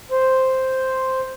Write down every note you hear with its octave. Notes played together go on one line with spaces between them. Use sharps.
C5